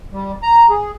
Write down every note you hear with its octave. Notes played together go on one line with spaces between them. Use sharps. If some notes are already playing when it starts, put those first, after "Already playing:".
G3
A#5
G#4